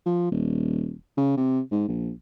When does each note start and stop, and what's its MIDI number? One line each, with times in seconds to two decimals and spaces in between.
0.06 0.31 53
0.31 0.94 27
1.17 1.34 49
1.37 1.60 48
1.72 1.83 44
1.88 2.10 34